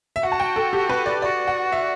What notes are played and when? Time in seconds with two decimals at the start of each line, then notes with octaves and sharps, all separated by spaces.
0.16 E5
0.23 F#4 F#5
0.32 A5
0.40 G5
0.56 A4
0.73 G4
0.89 B4
1.06 D5
1.22 F#4 D5
1.48 F#5
1.72 E5